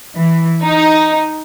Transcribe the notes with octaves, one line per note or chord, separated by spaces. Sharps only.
E3
D#4